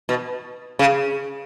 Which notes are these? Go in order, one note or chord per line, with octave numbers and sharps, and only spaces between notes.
B2
C#3